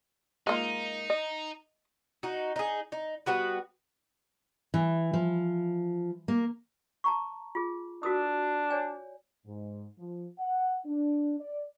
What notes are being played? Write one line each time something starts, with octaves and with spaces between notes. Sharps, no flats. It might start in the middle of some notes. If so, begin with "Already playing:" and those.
G#3 A#3 D#4 F4
D#5
D#4 F#4
D#4 G#4
D#4
G3 B3 F#4 B4
E3
F3
A#3
A5 A#5 C#6
F4 G#4
D4 F#4 A#4 D#6
C#5 D5 G#5
G#2
F3
F#5
D4
D5